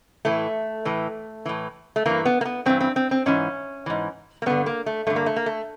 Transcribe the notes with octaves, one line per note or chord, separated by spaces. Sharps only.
A2 E3 A3
A2 E3
A2 E3
A3
G2 E3 A#3
B3
A#3
B3
G2 E3 C4
C4
C4
C4
G#2 E3 C#4
G#2 E3
A#3
G2 D3 B3
A#3
A3
G2 D3 A3
A#3
A3
A#3
A3